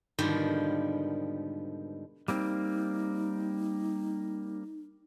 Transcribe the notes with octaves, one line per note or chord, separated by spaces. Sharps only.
G#2 B2 D3 D#3 F3 G3
G3 A#3 C4 D#4